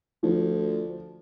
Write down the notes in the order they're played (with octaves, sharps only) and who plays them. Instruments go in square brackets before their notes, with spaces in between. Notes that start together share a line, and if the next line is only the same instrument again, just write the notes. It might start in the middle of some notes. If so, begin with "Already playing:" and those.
[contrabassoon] D2 [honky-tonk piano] F3